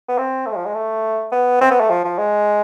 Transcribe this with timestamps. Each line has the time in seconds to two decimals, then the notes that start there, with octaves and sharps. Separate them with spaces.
0.08 B3
0.18 C4
0.46 A3
0.52 G#3
0.56 F3
0.66 G#3
0.74 A3
1.32 B3
1.61 C4
1.71 B3
1.80 A3
1.90 F3
2.04 F3
2.18 G#3